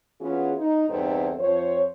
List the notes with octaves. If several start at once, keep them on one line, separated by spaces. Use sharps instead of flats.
E3 B3 C#4 F4 F#4 G#4
D#4
E2 G2 B3 C4 D#4 A4
F2 F3 C5 C#5